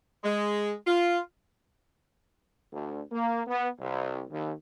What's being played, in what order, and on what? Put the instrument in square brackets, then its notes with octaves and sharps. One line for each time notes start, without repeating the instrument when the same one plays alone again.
[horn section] G#3
F4
[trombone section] D2
A#3
B3
C2
D#2